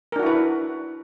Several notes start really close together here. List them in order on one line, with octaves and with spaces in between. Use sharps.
A#4 D4 F#4 E4 B4